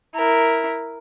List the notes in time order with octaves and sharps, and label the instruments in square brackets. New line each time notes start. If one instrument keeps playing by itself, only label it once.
[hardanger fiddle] E4 A#4